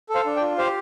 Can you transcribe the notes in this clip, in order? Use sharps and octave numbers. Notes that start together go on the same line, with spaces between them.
A4
C5 F5
D4
D5 G5
F4
G4 C5 F5